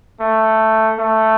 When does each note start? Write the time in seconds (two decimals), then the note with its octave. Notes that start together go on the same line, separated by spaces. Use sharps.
0.20 A3
0.99 A3